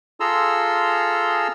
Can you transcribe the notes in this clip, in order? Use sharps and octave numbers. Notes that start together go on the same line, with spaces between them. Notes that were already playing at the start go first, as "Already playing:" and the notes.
F4 G#4 A4 A#5 C6 E6